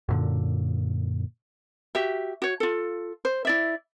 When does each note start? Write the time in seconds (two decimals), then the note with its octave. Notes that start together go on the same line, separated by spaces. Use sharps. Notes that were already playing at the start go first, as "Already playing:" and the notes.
0.09 F#2 A#2 D3
1.95 F#4 G4 E5
2.42 F#4 C#5
2.60 F4 A4
3.25 C5
3.45 E4 D5 E5